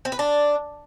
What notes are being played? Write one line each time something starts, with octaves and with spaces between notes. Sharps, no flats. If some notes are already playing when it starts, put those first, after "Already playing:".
C4
B4
D4